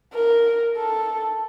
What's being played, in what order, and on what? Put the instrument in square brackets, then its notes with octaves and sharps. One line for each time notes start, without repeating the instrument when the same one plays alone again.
[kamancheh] A#4
A4